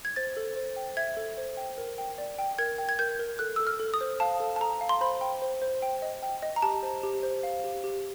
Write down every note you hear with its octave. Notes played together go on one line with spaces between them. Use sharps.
G#6
C5 A6
A4
C5
G5
E5 G#6
A4
C5
G5
A#4
G5
D5
G5
A#4 G#6
G5
G#6
A#4 G6
A#4
A4 F#6
A4 E6
F6
A4
D#6
C5
F5 A5
A4
A5
A4 A#5
F5
C6
C5 B5
G5
C5
C5
G5
D#5
G5
D#5
A#5
G4 A5
C5
G4
C5
F5
G4
G4